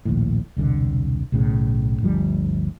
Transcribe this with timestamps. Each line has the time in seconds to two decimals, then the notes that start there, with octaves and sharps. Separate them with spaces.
0.05 A#1 D#2 A2
0.57 E1 C2 B2 D3
1.32 B1 A2 C#3
2.02 G1 D2 F3 G3